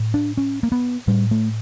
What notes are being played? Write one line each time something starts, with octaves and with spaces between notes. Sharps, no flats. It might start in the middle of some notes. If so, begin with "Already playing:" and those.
Already playing: A2
D4
C#4
A#3
B3
A2 G3
A3